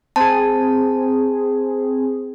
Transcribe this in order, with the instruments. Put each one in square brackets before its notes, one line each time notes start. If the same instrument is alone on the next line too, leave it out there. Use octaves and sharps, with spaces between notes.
[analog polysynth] C4 G#4 [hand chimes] A5